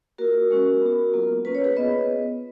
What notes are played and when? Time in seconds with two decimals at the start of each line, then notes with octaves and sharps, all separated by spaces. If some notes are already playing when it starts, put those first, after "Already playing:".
0.18 A#3 F4 F#4 A#4
0.50 G#3 C#4 F#4
0.82 B3 F#4
1.14 F#3 A#3 F4
1.45 A#3 C#4 F4 B4
1.55 C#5
1.64 G#4 B4
1.77 B3 F4 B4 D#5